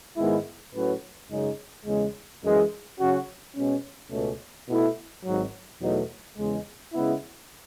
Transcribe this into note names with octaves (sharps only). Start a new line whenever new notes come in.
G#2 D#3 G#3 B3 E4
A2 F#3 C#4 F#4 B4
F#2 C#3 G#3 D#4
E2 C#3 G#3
F#2 E3 G#3
C#3 F#3 C#4 F#4
B2 G#3 C#4
C#2 B2 A3 C#4
B2 A3 E4 A4
G#1 G#2 F#3
E2 B2 F#3 A3 D#4
E2 C#3 G#3
C#3 G#3 B3 E4